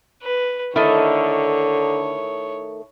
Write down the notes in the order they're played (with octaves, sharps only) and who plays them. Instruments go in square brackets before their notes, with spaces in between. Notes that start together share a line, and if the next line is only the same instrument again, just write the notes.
[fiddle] B4
[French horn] D3 [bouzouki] D#3 A3 D#4 [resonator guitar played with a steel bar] E4 [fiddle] C#5